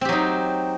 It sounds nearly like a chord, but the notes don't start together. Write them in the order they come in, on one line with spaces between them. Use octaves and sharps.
C4 G4 F#3 D#4